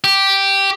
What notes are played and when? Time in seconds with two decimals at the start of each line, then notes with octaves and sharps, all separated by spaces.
0.04 G4